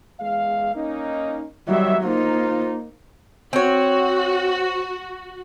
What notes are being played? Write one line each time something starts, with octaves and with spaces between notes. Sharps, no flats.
E2 G#3 F5
A#3 C#4 D#4
D#3 F#3 G3 C#5 E5
A#3 D#4 F4 C5
C4 F#4 C#5